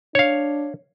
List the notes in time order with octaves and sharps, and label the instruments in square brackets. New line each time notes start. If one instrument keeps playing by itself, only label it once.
[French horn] D4 [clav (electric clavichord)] C#5 F5